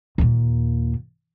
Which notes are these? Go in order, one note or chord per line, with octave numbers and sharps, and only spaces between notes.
D#2 A#2